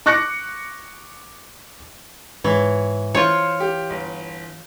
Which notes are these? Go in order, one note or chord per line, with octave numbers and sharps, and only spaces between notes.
C#6 D6 F#6 A#6 C#7
G#2 E3 C#5
E3 F4 C5 C#5
G4
G1